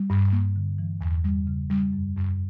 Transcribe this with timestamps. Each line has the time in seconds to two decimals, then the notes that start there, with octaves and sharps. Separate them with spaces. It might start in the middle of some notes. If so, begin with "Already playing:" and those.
Already playing: G3
0.10 G2
0.33 A#3
0.56 D3
0.79 E3
1.01 E2
1.24 G3
1.47 C#3
1.70 G3
1.93 F#2
2.16 F#2